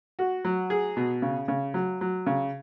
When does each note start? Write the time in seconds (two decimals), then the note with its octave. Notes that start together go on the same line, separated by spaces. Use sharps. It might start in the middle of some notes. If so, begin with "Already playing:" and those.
0.19 F#4
0.45 F#3
0.70 G#4
0.97 B2
1.22 C#3
1.48 C#3
1.74 F#3
2.01 F#3
2.26 C#3